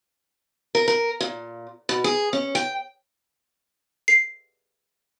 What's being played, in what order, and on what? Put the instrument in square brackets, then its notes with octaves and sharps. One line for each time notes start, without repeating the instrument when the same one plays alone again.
[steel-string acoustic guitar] A#4
A#4
A#2
B2
G#4
C#4
G5
[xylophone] C7